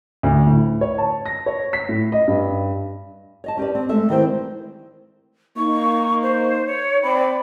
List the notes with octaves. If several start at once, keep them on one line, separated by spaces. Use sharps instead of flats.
D2
A2
C#5
A5
A#6
C#5
B6
A2
D#5
G2
C#5 D#5 A5
C#4 G4 B4 D5
C4
G#3 A3 E5
D#3 E3 G3 C4 C5
A#3 D#4 C#6
C5
C#5
C4 D5 B5